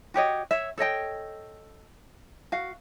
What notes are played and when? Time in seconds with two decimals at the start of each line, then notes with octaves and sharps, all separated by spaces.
0.14 F#4 G4 C#5 D#5
0.51 C#5 E5
0.78 A4 C#5 D#5 G5
2.52 F#4 F5